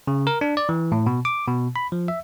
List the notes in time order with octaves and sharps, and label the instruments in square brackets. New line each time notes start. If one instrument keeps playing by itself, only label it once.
[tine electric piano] C#3
A#4
D4
D5
E3
A2
B2
D6
B2
B5
F3
E5